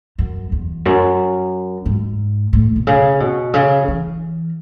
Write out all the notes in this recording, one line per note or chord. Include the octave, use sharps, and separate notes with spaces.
F#2
E2
F#2
G#2
A2
B2
C#3
B2
C#3
E3